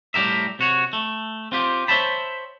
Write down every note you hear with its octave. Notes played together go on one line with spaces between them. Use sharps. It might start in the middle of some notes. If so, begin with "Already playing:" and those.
A2 G3 G4 A#4 E5
C3 F#4 C#5
A3
C4 F4 G4
C5 C#5 E5 G5 A5 B5